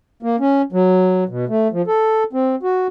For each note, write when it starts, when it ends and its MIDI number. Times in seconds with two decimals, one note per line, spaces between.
0.23 0.36 58
0.40 0.62 61
0.72 1.24 54
1.29 1.45 47
1.49 1.68 57
1.72 1.82 53
1.87 2.24 69
2.33 2.56 60
2.63 2.87 66